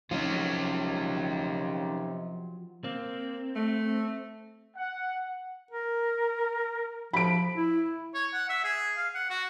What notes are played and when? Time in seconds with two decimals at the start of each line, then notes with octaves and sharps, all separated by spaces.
0.11 D#2 C3 F3 F#3 C#4 D#4 F4
2.84 A#3 C4
3.55 A3
4.77 F#5
5.71 A#4
7.13 F3 B5 D7
7.57 E4
8.15 C#5
8.33 F#5
8.50 E5
8.64 G#4
8.97 F5
9.15 F#5
9.30 F#4